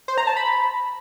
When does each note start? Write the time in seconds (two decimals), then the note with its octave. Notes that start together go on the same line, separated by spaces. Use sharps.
0.08 C5
0.18 A#5
0.27 A5
0.37 B5